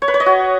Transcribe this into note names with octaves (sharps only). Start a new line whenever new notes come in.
C#5
B4
C#5
D#5
F#4